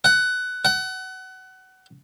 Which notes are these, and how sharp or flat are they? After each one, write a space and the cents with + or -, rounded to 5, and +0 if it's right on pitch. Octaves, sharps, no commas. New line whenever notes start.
F#5 +15
F#5 +25